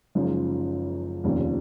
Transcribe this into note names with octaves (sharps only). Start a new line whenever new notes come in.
F#1 F#2 F3 G#3 D#4
F1 D#2 C#3 F3